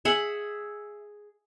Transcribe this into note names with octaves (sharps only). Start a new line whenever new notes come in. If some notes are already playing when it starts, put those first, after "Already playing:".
G#4 E5 F#5